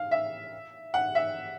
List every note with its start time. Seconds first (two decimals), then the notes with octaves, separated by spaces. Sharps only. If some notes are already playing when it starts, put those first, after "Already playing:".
Already playing: F5
0.11 E5
0.94 F#5
1.15 E5